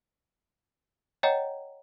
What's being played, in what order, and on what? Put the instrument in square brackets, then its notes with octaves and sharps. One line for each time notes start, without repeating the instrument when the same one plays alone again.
[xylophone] C#5 D#5 F#5 G5 A#5